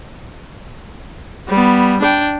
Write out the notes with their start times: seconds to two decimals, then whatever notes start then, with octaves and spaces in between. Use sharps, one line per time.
1.49 G3 B3
2.01 D4 G5